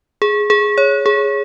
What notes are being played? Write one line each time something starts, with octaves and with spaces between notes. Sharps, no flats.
G#4
G#4
C#5
G#4